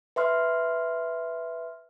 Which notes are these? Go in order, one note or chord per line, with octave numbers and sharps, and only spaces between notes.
B4 E5 C6 F6